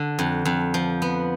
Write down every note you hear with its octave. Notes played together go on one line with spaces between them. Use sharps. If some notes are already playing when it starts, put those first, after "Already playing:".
Already playing: D3
F2
F2
F3
B3